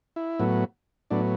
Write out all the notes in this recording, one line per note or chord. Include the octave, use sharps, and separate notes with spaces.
E4
A2 F#3 B3
A2 F#3 B3 D4